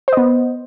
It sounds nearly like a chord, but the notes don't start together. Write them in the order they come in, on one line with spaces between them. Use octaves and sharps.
C5 D#5 B3